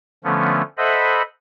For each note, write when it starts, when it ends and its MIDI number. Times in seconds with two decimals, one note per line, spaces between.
0.24 0.62 50
0.24 0.62 53
0.24 0.62 57
0.24 0.62 59
0.24 0.62 61
0.78 1.22 69
0.78 1.22 72
0.78 1.22 75
0.78 1.22 76
0.78 1.22 78
0.78 1.22 83